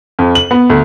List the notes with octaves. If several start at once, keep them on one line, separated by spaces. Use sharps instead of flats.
F2
F#7
B3
D2